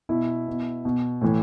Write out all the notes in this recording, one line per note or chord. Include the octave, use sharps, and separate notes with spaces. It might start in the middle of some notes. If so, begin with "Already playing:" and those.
B2 E4
B2
B2
A2 E3